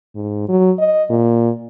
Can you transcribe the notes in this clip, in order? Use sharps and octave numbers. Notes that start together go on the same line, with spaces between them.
G#2
F#3
D#5
A#2